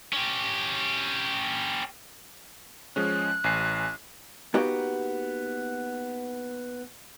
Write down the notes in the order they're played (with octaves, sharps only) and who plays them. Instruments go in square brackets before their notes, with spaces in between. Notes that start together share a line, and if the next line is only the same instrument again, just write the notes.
[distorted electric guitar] C#4 G4
[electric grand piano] F3 G#3 C#4 [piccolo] F#6
[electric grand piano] A1 G#5 C7
[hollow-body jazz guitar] A#3 B3 D#4 F#4 G4